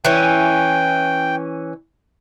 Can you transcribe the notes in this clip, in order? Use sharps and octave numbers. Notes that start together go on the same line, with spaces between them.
E3 C#4 G5